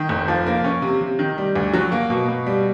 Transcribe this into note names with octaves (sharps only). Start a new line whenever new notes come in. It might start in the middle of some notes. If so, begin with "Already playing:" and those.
Already playing: D#3
F1
F3
A#3
C#4
C3
C3
D#3
G3
D2
F#3
A#3
B2
B2
G3